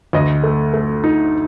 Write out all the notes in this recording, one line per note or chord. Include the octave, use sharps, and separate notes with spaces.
D2 D#5
A3
A3
D#4